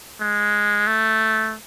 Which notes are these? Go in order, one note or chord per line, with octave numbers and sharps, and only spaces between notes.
G#3
A3